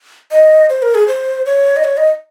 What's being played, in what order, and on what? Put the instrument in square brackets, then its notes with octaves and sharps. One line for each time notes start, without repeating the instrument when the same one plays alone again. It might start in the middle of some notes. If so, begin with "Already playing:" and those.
[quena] D#5
C5
A#4
G#4
C5
C#5
D#5
C#5
D#5